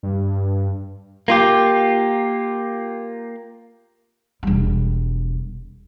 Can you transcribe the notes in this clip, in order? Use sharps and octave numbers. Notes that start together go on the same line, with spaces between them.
G2
A#3 F4 G4
E1 G3